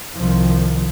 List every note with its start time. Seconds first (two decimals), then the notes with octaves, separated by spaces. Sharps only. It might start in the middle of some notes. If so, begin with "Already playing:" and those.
0.16 C2 D#3 F3